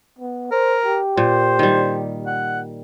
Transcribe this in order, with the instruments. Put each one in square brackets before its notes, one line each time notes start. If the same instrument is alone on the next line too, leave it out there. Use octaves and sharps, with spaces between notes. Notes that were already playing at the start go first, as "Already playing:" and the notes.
[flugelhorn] B3
[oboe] A#4 [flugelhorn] C5
[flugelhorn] G4
[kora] A#2 [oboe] C5
[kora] D#3 G3
[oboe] F#5